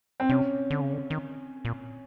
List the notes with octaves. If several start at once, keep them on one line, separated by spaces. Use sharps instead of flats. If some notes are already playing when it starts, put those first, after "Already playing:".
C4
C3 C#4
D3
C#3
D3
D#3
A#2